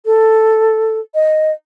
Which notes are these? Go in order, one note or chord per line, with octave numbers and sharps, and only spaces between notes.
A4
D#5